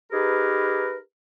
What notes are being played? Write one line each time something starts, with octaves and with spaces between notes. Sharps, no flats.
D#4 G4 G#4 A#4 B4